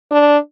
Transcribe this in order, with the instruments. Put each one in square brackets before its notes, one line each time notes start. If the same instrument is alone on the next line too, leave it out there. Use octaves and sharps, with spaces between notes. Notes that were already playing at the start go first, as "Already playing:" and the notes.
[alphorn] D4